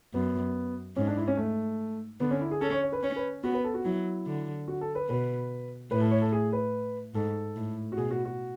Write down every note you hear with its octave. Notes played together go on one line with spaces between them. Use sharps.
F#2 B3
G#2 C#4
D4
E4
C#4
A3
D3 B3
C#4
E4
G#4
C#4 A4
C#5
C#5
B4
C#4 C#5
B4
B3 F#4
B4
A4
F#4
F#3 E4
D3
F#4
A4
B4
B2 B4
A2 B4
A4
C#5
A4
G#4
B4
G#2 A4
A2
F#4
B2 G#4
F#4
F#4